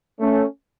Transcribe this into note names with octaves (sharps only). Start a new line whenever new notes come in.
A3 C#4